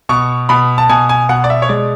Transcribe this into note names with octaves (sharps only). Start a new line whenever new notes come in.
B2 C#6
B2 B5
A5
B2 G#5
G#5
B2 F#5
D5
E5
C#5
G#3 D5